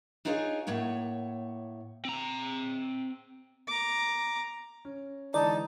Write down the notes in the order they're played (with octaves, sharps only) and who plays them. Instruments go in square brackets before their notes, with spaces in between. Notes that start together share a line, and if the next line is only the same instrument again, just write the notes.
[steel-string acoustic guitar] D4 D#4 F4 G#4 C#5 D#5
A2 A#3 C#5 F#5
[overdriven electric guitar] C4 A#5
[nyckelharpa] A#5 D6
[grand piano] C#4
[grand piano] D3 E3 G#3 [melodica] D#4 [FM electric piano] D5 [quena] A5